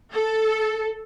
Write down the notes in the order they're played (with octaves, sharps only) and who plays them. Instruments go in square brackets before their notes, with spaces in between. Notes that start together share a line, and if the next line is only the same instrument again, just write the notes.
[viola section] A4